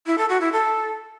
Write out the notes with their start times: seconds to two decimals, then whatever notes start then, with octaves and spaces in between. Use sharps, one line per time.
0.06 E4
0.18 A4
0.29 F#4
0.41 E4
0.52 A4